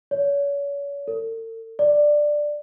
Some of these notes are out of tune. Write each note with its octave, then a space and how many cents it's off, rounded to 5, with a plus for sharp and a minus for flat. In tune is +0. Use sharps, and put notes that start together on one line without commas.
C#5 +35
A4 +45
D5 +10